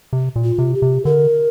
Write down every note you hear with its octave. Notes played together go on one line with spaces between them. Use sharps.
C3
A#2
F4
C3
G4
C3
D3 A#4